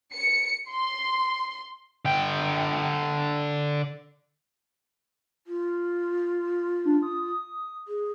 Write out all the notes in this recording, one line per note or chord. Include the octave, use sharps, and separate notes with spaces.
C#7
C6
D3 G5
F4
D4
D#6
G#4